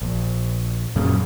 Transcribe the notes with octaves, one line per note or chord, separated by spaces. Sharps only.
A#1
F#2 A#2 C#3